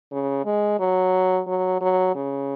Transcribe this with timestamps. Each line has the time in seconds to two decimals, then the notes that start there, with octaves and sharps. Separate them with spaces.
0.12 C#3
0.45 G#3
0.79 F#3
1.47 F#3
1.81 F#3
2.15 C#3